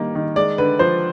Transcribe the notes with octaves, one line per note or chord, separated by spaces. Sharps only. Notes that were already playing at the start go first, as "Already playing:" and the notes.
Already playing: D#3 G3 A#3
D#3
G#3 D5
D3 B4
F3 C5